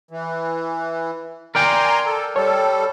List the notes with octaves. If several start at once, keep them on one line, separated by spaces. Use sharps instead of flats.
E3
A#4 D5 G5 G#5 A#5 C6
A4
G3 A4 C#5